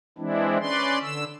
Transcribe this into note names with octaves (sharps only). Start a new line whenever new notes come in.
E3 G#3 C4 D4 E4
C#4 B4 D5 C6
D3 E6